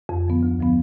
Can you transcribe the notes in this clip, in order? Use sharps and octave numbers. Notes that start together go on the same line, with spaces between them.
F2
D3 F3 B3
D2
D3 F3 B3